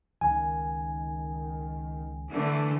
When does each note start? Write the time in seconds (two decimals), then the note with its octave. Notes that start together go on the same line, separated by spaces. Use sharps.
0.21 C#2 D#3 G#5
2.30 D3 E3 A3